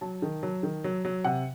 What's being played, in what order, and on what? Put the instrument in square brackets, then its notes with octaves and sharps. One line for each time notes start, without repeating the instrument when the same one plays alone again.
[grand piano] F#3 A5
D#3
F#3
D#3
F#3
F#3
C3 F#5